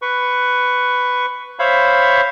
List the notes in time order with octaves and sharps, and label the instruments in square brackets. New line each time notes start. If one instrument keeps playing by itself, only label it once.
[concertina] B4 C#6
C5 C#5 E5 F5 B5